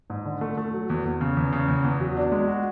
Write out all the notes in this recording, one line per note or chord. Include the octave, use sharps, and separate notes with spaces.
G#2
D3
A3
A3
F#3
E2
E2
C#3
E2
C#3
E2
E2
F#3
D4
G#3
F#4